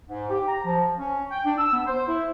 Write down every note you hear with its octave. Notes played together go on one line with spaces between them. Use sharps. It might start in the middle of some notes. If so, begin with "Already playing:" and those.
G#2
G4
A#5
F3
C#4
G5
D4
E6
B3
C5
E4